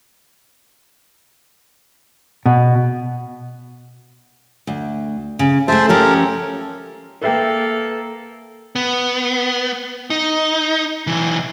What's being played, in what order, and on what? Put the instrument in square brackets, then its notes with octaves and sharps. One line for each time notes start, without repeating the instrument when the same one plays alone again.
[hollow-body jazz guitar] B2
[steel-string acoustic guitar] D2
C#3
[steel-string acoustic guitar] A3 G#4 [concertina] C5 E5 A5
[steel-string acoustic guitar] F3 C#4 G4 [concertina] A4 A#4
[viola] A#3 A4 [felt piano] B4 E5 G5
[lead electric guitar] B3
D#4
B1 E3